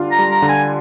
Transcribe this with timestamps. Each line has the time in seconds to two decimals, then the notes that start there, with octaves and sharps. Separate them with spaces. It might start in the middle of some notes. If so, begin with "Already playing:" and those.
Already playing: D3 G3 D4 F4
0.11 A#5
0.19 G3
0.31 A#5
0.42 D3
0.49 G#5